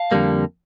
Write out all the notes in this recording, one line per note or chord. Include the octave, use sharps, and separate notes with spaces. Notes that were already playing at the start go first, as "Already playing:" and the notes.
Already playing: F5 A5
F2 D3 G3 A#3